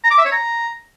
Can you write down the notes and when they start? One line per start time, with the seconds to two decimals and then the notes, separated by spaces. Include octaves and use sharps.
0.04 A#5
0.11 D6
0.18 E5
0.25 C#5
0.32 A#5